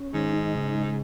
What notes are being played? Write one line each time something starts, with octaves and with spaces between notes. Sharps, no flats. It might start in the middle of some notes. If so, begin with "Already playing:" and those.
Already playing: C#4
G#2 D#3
D#4
C#3
G#3